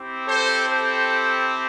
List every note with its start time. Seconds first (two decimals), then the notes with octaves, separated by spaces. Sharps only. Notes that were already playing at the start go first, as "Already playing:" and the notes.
Already playing: C4 E4 G4
0.28 A4 C5
0.69 A4 C5